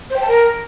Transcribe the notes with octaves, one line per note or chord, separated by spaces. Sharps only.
C5
G5
A5
A#4